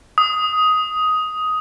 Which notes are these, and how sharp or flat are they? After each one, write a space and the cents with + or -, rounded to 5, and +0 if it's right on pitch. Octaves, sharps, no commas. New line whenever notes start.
D#6 +10